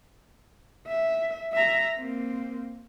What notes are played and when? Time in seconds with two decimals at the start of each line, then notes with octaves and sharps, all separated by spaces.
0.87 E5
1.53 E5 A#5
1.97 A#3 C4